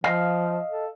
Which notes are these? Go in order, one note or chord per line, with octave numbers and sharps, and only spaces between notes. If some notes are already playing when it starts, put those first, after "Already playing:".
F3 D#5 F5
A4